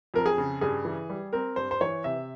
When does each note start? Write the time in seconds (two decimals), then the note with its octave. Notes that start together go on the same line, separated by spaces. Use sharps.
0.14 F2 A#4
0.26 G#4
0.38 C#3
0.61 G2 G#4
0.85 E3
1.10 G3
1.33 C4 A#4
1.56 G2 C5
1.71 C5
1.81 E3 C#5
2.04 C3 E5